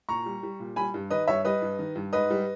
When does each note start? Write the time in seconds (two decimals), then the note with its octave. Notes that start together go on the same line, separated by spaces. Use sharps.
0.09 A#2 A#5 C#6
0.26 G3
0.43 G3
0.60 A#2
0.76 G3 G#5 B5
0.94 G2
1.10 D#3 B4 D#5
1.28 G2 C#5 E5
1.45 G3 B4 D#5
1.62 G2
1.79 D#3
1.96 G2
2.13 G#2 B4 D#5
2.30 G3